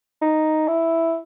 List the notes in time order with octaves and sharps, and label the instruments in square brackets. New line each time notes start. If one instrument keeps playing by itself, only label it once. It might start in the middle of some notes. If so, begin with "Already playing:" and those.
[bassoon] D#4
E4